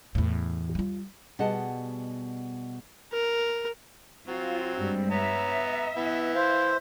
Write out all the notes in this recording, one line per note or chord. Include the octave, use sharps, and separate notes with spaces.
E2 A2
G3 F4
B2 G3 G#4 D#5 F#5 A5
A#4
F#3 C4 F4
G2 G3 G#3
B3 C#5 E5 A#5
E3 B3 E4
C5 F5